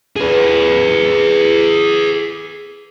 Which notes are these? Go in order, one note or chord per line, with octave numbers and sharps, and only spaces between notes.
G#4 B4